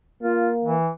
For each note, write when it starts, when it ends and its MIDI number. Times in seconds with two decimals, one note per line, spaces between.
0.23 0.77 58
0.23 0.49 65
0.65 0.89 52